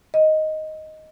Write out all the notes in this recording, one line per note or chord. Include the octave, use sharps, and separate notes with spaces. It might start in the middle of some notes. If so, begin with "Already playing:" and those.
D#5